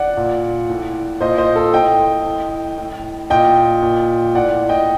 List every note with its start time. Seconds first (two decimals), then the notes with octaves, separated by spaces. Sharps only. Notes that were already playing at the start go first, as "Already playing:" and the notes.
Already playing: D5 F#5
0.17 A#2
0.69 A2
1.20 A#2 C5 D#5
1.38 C5 D#5
1.56 A4
1.74 A2 D#5 G5
2.26 A2
2.78 A2
3.30 A#2 D#5 G5
3.82 A#2
4.35 A2 D5 F#5
4.69 D#5 G5